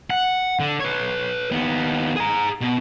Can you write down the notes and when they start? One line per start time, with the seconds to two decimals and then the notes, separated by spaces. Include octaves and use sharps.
0.10 F#5
0.60 D3
0.80 B4 C#5
1.52 D#2 B3
2.16 G#4 A#5
2.61 B2